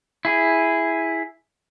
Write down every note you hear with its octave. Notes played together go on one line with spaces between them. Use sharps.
E4 G#4